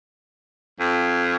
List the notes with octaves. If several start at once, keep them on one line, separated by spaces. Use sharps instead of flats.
F2